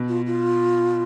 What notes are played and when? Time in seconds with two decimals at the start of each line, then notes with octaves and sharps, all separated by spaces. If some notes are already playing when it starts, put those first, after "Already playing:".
Already playing: B2
0.09 F4
0.26 F4